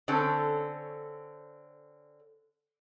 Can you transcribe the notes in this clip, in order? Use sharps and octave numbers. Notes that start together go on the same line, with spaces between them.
D3 C4 C#4 A4